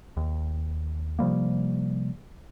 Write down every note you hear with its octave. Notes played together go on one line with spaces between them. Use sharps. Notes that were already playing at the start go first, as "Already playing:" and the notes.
D#2
C3 F3 G3 A#3